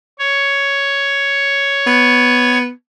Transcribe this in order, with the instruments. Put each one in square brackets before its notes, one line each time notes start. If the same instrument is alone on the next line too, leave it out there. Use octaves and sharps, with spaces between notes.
[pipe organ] C#5
[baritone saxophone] B3